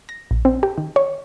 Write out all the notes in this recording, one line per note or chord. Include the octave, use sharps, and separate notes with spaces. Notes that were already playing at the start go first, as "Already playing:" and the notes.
A#6
A#1
C4
G4
D#3
C#5